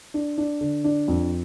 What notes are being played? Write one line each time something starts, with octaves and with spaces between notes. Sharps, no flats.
D4
D4
D3
D4
F2